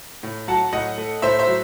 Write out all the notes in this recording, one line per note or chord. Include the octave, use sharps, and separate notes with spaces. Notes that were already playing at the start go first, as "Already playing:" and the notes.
A2
F#3 F#5 A5
A2 D#5 F#5
A3
A2 C5 E5
C5 E5
F#3